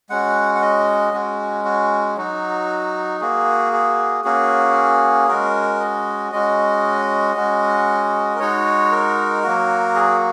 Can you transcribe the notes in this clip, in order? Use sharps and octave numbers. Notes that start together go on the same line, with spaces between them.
G#3 C#4 F#4 F#5
F#5
D#5
G#3 C#4 F#4
F#4
F#3 D#4 F#4
A#3 F#4 G#4
G#4
A#3 C#4 F#4 G#4
G#3 C#4 F#4 A#4
D#5
G#3 C#4 F#4 D#5
G#3 C#4 F#4
A#4
G#3 D#4 F#4 C#5
A#4
F#3 A#3 F#4
G#4